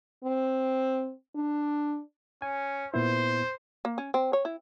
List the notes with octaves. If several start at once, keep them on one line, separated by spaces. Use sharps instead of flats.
C4
D4
C#4 G#5
A#2 B3 E4 C5
A#3
C#4
C4
C#5
E4